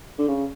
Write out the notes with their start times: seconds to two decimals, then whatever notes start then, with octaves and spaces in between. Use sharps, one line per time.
0.18 D3
0.27 C#3